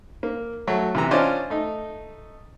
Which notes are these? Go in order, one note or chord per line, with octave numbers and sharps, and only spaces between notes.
A#3
F#3 A3
C3 E3 A#5
C#4 D4 F4 C5 D5 D#5
A3 D#4